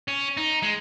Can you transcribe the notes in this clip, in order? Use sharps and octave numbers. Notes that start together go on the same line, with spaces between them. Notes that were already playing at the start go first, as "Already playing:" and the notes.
C#4
D#4
G#3